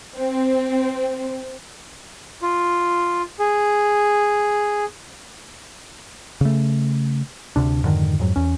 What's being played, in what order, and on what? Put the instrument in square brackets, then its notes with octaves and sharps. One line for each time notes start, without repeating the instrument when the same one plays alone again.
[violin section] C4
[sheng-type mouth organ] F4
G#4
[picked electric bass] C#3 A3
D2 C3 D4
F2 G#2 D3 D#3
F2 G#2 F#3
E2 C#4